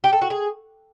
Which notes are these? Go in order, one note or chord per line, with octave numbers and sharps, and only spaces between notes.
G4
A4
F#4
G#4